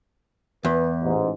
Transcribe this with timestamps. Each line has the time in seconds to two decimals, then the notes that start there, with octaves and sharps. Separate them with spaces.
0.65 E2 B4
1.02 A1 G#2